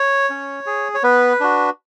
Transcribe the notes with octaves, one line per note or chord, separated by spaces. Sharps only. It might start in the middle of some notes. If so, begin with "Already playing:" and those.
Already playing: C#5
C#4
G#4
C#5
B3 B4
D4 F#4